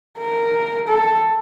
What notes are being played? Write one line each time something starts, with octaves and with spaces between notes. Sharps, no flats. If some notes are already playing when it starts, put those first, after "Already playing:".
A#4
A4